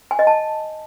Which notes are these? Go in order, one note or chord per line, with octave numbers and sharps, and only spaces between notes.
G#5
D#5
A5